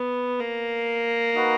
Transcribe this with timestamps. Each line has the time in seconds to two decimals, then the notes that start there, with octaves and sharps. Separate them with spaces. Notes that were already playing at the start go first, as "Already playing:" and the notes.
Already playing: B3
0.40 A#3
1.35 D#4 F#4 B4